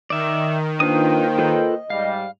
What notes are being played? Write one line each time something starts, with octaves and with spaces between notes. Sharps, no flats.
D#3 D5 E5
A#3 D4 F4 B4 C5 G5 D#6
F4 A4 B4 D#5
G#2 G3 F5